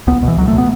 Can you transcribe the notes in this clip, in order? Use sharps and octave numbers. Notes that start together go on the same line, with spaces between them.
C#2 B3
B2 E3
C#2 F#3
A3
B2
B3